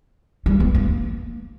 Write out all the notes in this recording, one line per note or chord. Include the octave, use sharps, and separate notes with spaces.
G3
B3
A#3